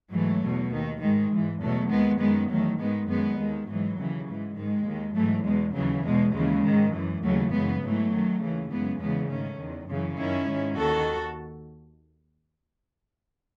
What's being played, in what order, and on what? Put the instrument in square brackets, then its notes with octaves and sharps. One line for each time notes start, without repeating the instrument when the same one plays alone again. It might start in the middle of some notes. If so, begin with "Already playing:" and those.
[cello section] G#2 E3 F#3 A3
E2 B2
D#2 D#3
G#2 D#3 G#3
G#2 E3
E2 B2 F#3 A3
D#2 D#3 G#3 B3
F#2 D#3 G#3 B3
E2 D#3 F#3 A3
G#2 D#3 G#3 B3
F#2 D#3 G#3 B3
D#2 D#3 G#3
G#2 E3 F#3
D#2 C#3 E3
G#2 E3
G#2 D#3 G#3
D#2 D#3
G#2 E3 F#3 A3
E2 B2 G#3
D#2 C#3 E3 F#3
E2 B2 G#3
D#2 C#3 E3 G#3
G#2 D#3
F#2 E3
D#2 C#3 E3 F#3 A3
F#2 C#3 E3 G#3 B3
G#2 E3 F#3 A3
F#2 D#3
D#2 C#3 E3
F#2 C#3 E3 G#3 B3
E2 C#3 E3 G#3 B3
G#2 D#3 A3 C#4
E2 D#3
F#2 C#3 E3
F#2 D#3 C#4 E4
G#2 D#3
D#2 D#3 F#4 A4